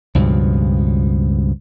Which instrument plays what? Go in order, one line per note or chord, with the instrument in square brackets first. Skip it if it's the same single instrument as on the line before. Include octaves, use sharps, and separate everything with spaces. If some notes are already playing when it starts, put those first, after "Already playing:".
[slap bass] C#2 G2 B2 F3